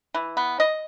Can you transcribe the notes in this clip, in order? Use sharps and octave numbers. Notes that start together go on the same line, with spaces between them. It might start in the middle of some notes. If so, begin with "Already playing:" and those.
E3
B3
D#5